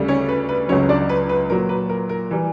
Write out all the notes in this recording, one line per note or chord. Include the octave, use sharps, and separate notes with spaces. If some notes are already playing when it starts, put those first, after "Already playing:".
Already playing: D2 C#3 G3
C#4 C#5
B4
B4
C#2 C#3 F#3 C#4 C#5
D4 D5
B4
B4
A#2 F#3 A#4
B4
A#4
A#4
E3 G3